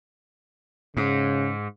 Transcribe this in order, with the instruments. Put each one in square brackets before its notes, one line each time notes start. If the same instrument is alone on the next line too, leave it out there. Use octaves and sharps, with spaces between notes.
[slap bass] G#2 [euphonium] C#3